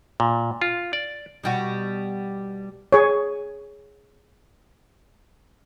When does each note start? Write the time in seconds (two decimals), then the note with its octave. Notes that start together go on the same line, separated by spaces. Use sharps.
0.20 A#2
0.62 F4
0.93 D5
1.44 B2 G3 F#4
2.92 G#4 C#5